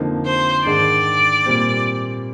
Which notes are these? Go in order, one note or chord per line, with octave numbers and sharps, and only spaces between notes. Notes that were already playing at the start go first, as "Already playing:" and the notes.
Already playing: F2 D3 F3 A#3 D#4
C5
G#2 D#3 G#3 D4 D5
A#2 G3 C4